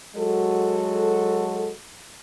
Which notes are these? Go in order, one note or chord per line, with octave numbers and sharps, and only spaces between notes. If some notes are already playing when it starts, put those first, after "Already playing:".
F#3 G#3 F#4 A4